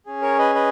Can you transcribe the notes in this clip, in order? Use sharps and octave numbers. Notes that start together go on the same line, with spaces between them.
C#4 G#4
A#4 C#5
B4 D#5
B4 D#5